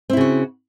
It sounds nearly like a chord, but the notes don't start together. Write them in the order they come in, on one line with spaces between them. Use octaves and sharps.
C4 E4 C#3 F#4